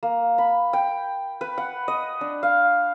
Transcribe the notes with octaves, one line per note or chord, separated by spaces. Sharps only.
A#3
B5
G5
B4
F#5
D#5
D4
F5